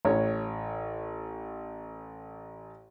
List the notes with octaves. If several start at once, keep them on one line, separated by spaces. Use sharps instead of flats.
A1 C#5